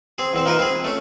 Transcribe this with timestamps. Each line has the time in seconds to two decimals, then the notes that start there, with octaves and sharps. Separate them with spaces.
0.18 C4 G#4
0.33 E2 C4 C5
0.46 A#3 D#4 F4 A#4 B4
0.59 C4 G#4
0.84 A3 C#4